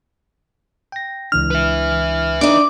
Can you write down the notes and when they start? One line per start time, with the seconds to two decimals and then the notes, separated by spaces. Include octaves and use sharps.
0.92 G5 A#6
1.32 C#2 E3 D4 F6
1.51 B4 E5
2.41 D4 D#4 D6